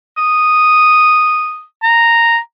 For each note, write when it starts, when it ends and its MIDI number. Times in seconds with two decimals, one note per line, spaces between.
0.18 1.63 87
1.83 2.38 82